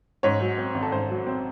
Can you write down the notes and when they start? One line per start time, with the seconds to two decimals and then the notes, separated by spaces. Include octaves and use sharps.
0.23 G#2 C#5
0.41 F#3
0.57 C4
0.75 G#1
0.82 A4
0.92 G#2 C5
1.10 F#3
1.27 C4